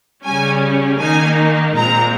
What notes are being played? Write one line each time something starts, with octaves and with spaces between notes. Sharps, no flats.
C#3 G3 C#4 G#5
D#3 A#3 D#4 G#5
A#2 G#3 C4 A#5